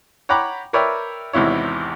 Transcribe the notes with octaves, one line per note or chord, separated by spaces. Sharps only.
C#5 F#5 G5 A#5 B5 D6
A#4 B4 C#5 D5 E5 G5
G#1 E2 C3 E4 C#5